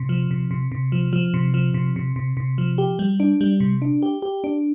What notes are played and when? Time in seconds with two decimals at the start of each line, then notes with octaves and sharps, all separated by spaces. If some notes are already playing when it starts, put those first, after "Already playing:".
Already playing: C3
0.09 F3
0.31 C3
0.51 C3
0.72 C3
0.92 F3
1.13 F3
1.34 C3
1.54 F3
1.74 C3
1.96 C3
2.16 C3
2.37 C3
2.58 F3
2.78 G4
2.99 G3
3.20 D4
3.41 G3
3.60 C3
3.82 D4
4.02 G4
4.22 G4
4.44 D4